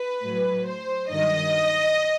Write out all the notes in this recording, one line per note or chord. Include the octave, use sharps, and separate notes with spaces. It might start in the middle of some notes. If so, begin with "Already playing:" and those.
Already playing: B4
A2 F#3
C5
G2 D#3 F#3 D#5